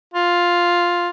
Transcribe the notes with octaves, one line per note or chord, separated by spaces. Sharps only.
F4